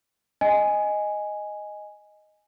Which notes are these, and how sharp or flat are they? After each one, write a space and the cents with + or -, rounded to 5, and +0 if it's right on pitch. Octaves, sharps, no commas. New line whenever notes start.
D#5 +0 G#5 +0